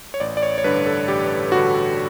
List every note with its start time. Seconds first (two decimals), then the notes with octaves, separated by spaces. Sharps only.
0.14 C#5
0.20 A1 D5
0.37 D5
0.42 C#5
0.58 C#5
0.64 G2 D3 B4
0.86 A4
1.08 A1 G4
1.52 G2 D3 F#4